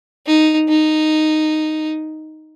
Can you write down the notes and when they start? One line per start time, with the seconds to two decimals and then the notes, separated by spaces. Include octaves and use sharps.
0.26 D#4
0.69 D#4